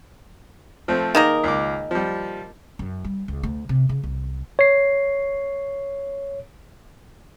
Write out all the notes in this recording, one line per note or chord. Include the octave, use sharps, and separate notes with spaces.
F3 A3 C4
D#3 A#3 G#4 A#4 D#5
C#2 D6
F3 G3
F#2
G3
C#2
D2
C3
C#3
C2
C#5 C7